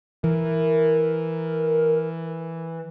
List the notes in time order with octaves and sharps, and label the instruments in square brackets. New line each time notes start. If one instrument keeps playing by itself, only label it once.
[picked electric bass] E3 [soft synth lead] A#4